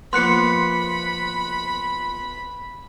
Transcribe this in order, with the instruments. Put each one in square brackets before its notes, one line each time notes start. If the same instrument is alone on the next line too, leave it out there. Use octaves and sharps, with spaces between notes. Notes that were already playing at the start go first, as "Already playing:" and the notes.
[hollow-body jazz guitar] F3 A#3 B3 [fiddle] B5 [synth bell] C6 F#6 C#7